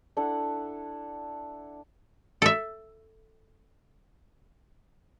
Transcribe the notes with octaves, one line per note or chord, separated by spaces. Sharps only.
D4 E4 A4 F#5
A4 E5